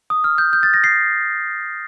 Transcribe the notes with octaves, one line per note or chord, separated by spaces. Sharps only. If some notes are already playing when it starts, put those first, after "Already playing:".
D#6
F6
G6
G6
A6
A#6
C7